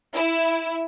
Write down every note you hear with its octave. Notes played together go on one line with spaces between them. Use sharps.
E4